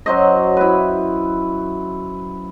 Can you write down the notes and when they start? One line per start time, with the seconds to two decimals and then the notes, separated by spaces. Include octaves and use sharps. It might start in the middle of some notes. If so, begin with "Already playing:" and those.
0.06 F#2 F#3 C5 D#5
0.57 E4 B4